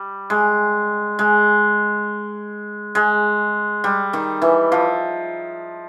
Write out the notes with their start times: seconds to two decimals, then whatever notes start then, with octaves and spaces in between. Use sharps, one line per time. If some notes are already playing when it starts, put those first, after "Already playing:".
Already playing: G3
0.30 G#3
1.19 G#3
2.95 G#3
3.84 G3
4.13 D#3
4.42 E3
4.72 F3